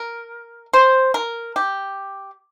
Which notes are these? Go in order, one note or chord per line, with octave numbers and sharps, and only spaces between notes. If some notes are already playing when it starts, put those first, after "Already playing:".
Already playing: A#4
C5
A#4
G4